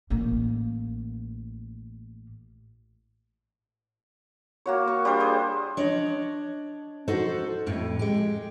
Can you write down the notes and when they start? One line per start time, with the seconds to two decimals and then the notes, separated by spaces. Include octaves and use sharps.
0.10 A1 A#3
4.66 A#3 F#4 C#5
4.87 C#6
5.05 G3 D4 C5
5.20 G#4 C5
5.77 D4 C#5 D#5
7.08 D#4 F#4 A4 C5
7.66 F2 A2
7.99 G#3 G4